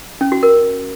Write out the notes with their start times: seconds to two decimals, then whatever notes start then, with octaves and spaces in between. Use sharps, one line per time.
0.21 C#4
0.32 F#4
0.43 A#4